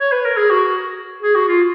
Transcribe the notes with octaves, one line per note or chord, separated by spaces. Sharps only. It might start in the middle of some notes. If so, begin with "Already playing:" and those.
C#5
B4
A#4
G#4
F#4
G#4
F#4
F4